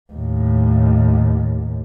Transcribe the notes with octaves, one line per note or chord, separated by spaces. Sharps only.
D#2 A2